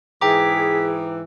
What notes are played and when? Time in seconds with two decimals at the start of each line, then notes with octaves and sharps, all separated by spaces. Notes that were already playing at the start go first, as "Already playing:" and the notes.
0.21 G#2 E3 G#4 G5 A#5 D6 B6